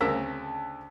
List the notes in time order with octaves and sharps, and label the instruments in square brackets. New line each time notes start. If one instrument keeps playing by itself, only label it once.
[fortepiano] D2 C#3 C4 [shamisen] A#4 [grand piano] A5 E6 B6